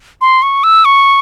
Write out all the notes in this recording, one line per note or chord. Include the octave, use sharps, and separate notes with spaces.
C6
C#6
E6
C#6